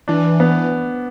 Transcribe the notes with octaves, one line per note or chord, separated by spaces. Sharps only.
E3 D4
B3